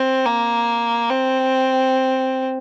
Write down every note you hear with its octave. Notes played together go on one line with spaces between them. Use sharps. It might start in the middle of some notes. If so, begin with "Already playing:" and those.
Already playing: C4
A#3
C4